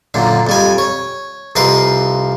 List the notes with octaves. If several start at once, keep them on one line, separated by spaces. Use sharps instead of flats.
F#2 A#2 D3
F2 G3 G#5
C#5
C2 F2 A#4 B4 F5 C6